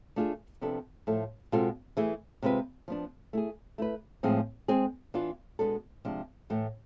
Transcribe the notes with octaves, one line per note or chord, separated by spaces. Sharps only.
A3 D4 F4 G#4
C3 F3 B3 D4 A4
A2 F3 A3 E4 A4
B2 G#3 C4 F4 A4
E3 A3 E4 G#4
C3 G#3 C4 F4 B4
F3 B3 D4
A3 E4 G#4
A3 E4 B4
A2 F3 G#3 C4 G#4
G#3 C4 G#4
E3 B3 D4 F4
B2 G#3 B3 D4 A4
C3 F3 G#3 D4
A2 E3 A3